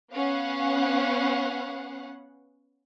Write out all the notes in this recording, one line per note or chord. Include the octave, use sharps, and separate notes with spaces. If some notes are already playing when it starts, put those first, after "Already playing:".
B3 C#4 F5 F#5